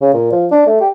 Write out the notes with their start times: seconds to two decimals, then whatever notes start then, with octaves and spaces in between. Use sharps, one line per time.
0.01 C#3
0.14 A#2
0.32 F3
0.51 D4
0.67 A3
0.81 G4